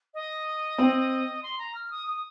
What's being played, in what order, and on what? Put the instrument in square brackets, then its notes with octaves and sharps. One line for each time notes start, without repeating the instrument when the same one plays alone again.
[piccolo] D#5
[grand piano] C4
[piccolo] C6
A#5
F6
D#6
D#6